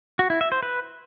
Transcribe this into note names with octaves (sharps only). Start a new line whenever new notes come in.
F#4
E4
E5
C5
B4